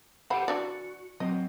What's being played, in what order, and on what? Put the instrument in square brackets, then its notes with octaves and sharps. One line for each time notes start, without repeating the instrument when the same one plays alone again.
[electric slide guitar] G4 A4 C5 [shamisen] F#5 B5
[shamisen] E3 D4 D5 [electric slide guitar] F#4
[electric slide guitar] F#3 C4 [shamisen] D#5